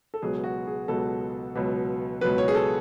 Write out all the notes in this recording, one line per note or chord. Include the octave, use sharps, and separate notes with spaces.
A4
C#2 B2 F#3 G#4
F#4
G#4
C#2 B2 F#3 A4
C#2 B2 F#3
C#2 B2 F#3 B4
C#5
G#4
A4